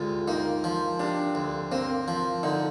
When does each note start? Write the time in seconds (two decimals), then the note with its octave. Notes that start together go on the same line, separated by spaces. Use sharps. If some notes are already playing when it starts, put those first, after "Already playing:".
Already playing: D2 C3 G#3 F4
0.28 A#3 D#4
0.64 F3
0.99 C3 D4
1.35 D2
1.72 A#3 C4
2.08 F3
2.43 D3 D#4